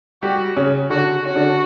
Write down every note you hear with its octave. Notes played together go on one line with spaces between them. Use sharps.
G3 F#4 G4
C#3 C#4
D3 D4 F#4
C#4 F#4
D3 D4